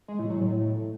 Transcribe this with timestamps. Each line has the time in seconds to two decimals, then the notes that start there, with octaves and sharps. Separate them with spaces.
0.08 G#3
0.19 A2
0.30 F#3
0.41 A2